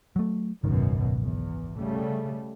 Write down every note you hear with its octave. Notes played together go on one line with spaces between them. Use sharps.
F#3 A3
G#1 C#2 F#2 B2 D#3
E2
C#3 G3 A3